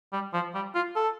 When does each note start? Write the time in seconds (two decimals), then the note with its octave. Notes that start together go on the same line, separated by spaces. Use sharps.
0.13 G3
0.34 F3
0.55 G3
0.75 F4
0.96 A4